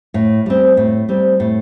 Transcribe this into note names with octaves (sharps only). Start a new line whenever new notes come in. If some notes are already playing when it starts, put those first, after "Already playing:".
A2
G3 C4
A2
G3 C4
A2